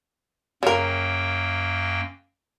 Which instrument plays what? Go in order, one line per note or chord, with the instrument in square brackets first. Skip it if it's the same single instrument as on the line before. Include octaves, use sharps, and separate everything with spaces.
[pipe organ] F#2 A#3 G5 [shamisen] C#3 A#4